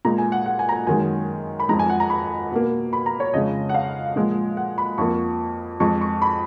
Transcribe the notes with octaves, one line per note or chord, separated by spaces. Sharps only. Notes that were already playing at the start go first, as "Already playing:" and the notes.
A#2 G#3 A#5
G#5
F#5
F#5
G#5
A#5
G#5
F#2 D#3 G#3 G#5
B5
F2 F3 G#3 A#5
G#5
F#5
A#5
B5
B2 A#3
B5
A#5
C#5
F2 C#3 G#3 D#5
F#5
F5
A#2 F3 G#3
F#5
B5
F2 F3 A#3 C#6
F2 F3 G#3 C#6
C#6
B5